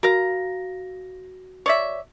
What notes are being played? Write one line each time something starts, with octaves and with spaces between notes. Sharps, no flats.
F#4 A#4 F5 A#5 A#6
C#5 D5 E5